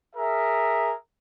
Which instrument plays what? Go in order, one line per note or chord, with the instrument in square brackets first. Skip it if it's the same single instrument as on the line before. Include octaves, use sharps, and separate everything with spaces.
[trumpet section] G#4 A#4 E5